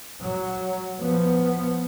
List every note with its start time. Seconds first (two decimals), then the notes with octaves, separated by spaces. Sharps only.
0.21 F#3
1.00 F3 B3